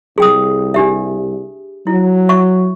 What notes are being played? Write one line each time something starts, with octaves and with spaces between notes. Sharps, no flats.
C2 G#4 G5 D#6
D4 G4 E5
F#3 E4
E5 C#6